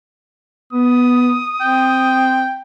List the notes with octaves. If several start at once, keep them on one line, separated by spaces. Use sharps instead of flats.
B3 D#6
C4 G5